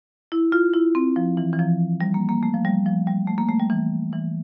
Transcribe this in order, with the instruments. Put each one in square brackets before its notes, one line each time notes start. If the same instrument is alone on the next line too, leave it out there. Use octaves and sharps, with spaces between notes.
[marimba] E4
F4
E4
C4
F3
E3
E3
F3
G3
A#3
A#3
A3
F3
G3
F3
G3
A3
A#3
A3
G3
E3
E3